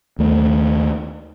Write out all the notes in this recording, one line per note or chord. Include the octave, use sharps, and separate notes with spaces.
D#2 A3